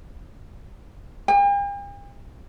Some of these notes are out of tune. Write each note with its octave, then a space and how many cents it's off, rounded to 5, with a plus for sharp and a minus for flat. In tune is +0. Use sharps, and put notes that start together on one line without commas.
G5 +45